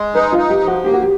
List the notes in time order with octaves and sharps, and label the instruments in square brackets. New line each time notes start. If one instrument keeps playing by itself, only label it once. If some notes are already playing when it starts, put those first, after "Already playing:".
Already playing: [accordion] G#3
[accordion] D#4 [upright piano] B4
[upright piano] F4
[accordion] D#4
[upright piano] G4
[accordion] F3
[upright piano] F#4
[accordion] A#3 [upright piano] G4
[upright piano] F#4
G4